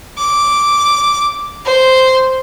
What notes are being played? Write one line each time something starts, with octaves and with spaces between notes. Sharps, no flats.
D6
C5